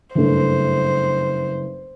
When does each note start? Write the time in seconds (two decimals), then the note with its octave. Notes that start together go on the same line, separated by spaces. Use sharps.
0.15 F#1 G2 A3 C5